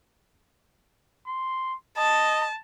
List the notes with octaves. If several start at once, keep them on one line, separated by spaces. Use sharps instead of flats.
C6
D#5 A5